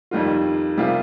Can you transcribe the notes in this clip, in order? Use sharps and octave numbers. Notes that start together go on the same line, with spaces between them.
F2 D#3 G3 A#3 F4
C3 G3 A#3 F4 G#4